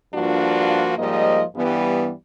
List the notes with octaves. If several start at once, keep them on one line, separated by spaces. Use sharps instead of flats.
G2 F3 A#3 D4 F4 F#4
G#2 F3 G3 A#3 D#5
G2 E3 G3 B3